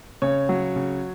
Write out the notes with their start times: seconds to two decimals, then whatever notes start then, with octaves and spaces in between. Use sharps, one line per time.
0.22 C#3 C#5
0.49 F#3
0.76 C#3